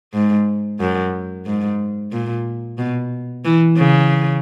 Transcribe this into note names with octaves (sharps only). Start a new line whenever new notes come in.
G#2
F#2
G#2
A#2
B2
E3
C#3